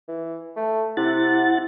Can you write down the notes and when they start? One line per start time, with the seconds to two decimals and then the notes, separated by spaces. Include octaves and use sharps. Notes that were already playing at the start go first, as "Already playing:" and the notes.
0.08 E3
0.56 A3
0.97 C3 E4 F#5 A6